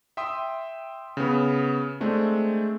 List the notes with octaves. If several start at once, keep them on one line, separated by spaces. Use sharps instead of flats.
E5 G5 C6 D#6
C#3 B3
G#3 A3 C4 D4